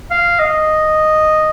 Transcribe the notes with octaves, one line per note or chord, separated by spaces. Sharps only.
F5
D#5